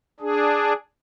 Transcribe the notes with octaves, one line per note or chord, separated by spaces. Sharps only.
D4 G#4